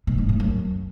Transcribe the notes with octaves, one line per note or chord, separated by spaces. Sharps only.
B2
G#2
A2
F#2